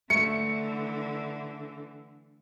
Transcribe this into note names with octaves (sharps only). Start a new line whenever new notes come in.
D3 E3 A3 C#7